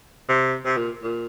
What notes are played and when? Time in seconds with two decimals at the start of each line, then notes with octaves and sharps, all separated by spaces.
0.29 C3
0.65 C3
0.77 A#2
1.03 A#2